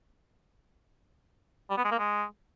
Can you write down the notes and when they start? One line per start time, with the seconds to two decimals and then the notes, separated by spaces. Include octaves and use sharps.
1.70 G3
1.78 B3
1.85 G#3
1.92 A#3
1.99 G#3